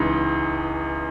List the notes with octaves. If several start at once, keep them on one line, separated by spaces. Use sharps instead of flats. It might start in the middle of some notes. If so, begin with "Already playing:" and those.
Already playing: C#2 C#3 E3 D#4